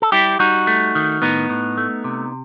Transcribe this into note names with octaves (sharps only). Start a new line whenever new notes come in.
A4
G3 E4 G4
G3 D#4 F#4
A3
D#3
A2 B3 D#4
A2
A3
C3